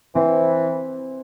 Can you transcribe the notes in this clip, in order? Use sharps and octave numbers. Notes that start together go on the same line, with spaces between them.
E3 C4